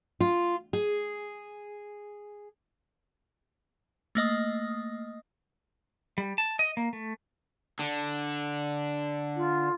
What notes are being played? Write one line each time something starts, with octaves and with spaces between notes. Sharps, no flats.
F4
G#4
A3 A#3 D#5 D#6
G3
A5
D#5
A#3
A3
D3
F4